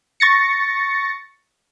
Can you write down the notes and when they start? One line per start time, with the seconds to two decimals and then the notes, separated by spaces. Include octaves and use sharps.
0.20 C#6 A6 A#6 C#7